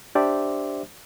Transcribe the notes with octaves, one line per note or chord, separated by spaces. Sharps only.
D4 G4 C5 D5 E5